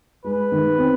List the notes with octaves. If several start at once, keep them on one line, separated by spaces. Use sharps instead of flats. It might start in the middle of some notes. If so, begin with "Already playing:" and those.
G#3 B4
D#3
C4